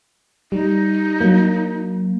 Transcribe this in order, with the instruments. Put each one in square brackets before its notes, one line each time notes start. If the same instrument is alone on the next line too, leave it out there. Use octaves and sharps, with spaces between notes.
[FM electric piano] G3 [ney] D#4
[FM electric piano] F#3 A#3